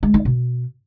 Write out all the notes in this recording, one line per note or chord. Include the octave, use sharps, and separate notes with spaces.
G#3
D#4
B2